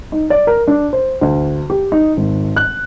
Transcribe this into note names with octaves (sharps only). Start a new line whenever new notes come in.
D#4
D5
A#4
D4
C5
D2
G4
D#4
G#1
F#6